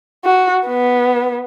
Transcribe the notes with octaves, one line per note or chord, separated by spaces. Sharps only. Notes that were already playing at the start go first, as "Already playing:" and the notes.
F#4
B3